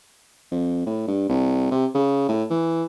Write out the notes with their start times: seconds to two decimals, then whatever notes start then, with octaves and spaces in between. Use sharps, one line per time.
0.52 F2
0.87 A2
1.08 G2
1.29 C2
1.71 C3
1.94 C#3
2.29 A2
2.50 E3